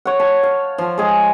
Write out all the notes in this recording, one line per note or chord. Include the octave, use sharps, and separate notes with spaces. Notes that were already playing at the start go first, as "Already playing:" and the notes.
C#5 F#5
A5
F5
F3
G#3 G#4